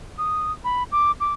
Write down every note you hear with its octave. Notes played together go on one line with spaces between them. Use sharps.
D#6
B5
D6
D6